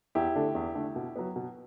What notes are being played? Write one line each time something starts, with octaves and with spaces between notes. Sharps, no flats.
E2 E4 G4
D3 A3 D4
E2
D3 A3 D4
B2
F#3 B3
B2